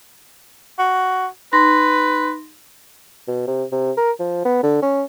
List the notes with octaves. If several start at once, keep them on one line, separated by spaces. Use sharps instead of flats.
F#4
D#4 B4 C6 A#6
B2
C3
C3
A#4
F3
B3
D3
C#4